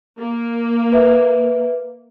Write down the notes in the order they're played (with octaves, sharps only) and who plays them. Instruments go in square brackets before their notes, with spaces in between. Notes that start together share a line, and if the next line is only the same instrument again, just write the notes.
[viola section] A#3
[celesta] B4 E5